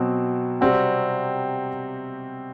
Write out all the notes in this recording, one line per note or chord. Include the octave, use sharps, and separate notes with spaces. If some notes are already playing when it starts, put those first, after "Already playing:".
Already playing: B2 F#3 C4
C3 G3 C4 F#4